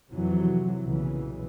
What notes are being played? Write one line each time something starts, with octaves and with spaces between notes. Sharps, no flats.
F2 C3 E3 F#3
B1 A#2 C#3 E3